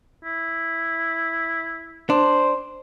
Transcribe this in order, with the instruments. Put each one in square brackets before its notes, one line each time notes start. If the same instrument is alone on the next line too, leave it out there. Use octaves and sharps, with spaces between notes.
[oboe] E4
[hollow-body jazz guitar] D4 [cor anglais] C5